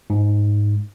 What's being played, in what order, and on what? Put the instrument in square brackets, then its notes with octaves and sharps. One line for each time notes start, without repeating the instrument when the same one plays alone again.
[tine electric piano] G#2